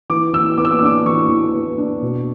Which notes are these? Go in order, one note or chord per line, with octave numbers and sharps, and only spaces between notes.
E3 D6
E3 E6
B3 D6
E6
D6
E6
D4 D6
E3 C#6
E3
B3
D4
B2